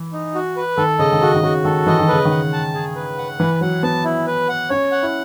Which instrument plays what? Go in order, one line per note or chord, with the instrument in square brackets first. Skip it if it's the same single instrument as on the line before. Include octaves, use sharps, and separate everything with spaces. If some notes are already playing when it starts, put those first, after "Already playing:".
Already playing: [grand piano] E3
[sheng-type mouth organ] D#4
F#4
B4
[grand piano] D#3 [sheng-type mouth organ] A4
[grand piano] C#3 [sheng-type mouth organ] D#5
[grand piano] D#3
[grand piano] C#3 [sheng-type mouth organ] F#4
[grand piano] D#3
[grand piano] C#3 [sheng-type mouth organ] F#4
[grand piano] D#3 [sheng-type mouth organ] A4
[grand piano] E3 [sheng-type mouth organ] D#5
[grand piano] D#3
[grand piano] C#3 [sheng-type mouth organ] B4
[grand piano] D#3
[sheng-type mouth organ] F#5
A5
G#4
B4
F#5
[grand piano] E3 [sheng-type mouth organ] B4
[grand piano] F#3 [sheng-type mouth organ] F#5
[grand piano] B3 [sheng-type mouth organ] A5
[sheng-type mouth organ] E4
B4
F#5
[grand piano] C#4 [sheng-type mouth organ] C#5
[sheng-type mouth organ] F#5
[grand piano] E4